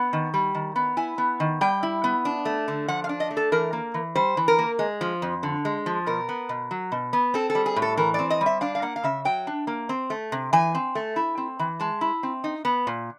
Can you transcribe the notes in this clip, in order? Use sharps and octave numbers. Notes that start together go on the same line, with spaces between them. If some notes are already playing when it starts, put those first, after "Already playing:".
Already playing: B3 F#5
D#3
G3
D#3
B3
E4 G#5
B3
D#3
G3 G5
E4
B3
D4
A3
D3
F3 F#5
F5
D4
D#5
A3
A4
E3 A#4
A#3
E3
G3 C5
E3
A#4
A#3
G#3
F3
F2
D3
G#3
F3
B2 A#4
B3
B2
F#3
B2
B3
C4 A4
A4
G3
G#4
A2
A4
E3 A#4
C4 D5
D#5
G3
E5
D4 F5
F5
A#3 F#5
F5
C#3 E5
F#3 G5
D4
A#3
C4
A3
C3
E3 G#5
C4
A3
E4
C4
E3
G#3 A5
E4
C4
D#4
B3
A#2